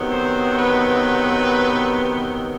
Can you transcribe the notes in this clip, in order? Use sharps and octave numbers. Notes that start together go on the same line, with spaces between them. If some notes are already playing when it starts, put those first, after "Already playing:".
Already playing: C3 D#3 F#3 B3
C5
B4